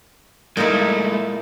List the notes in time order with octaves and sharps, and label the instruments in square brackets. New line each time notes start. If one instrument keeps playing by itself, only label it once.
[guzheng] A#2 D#4 E4 [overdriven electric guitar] G#3 A3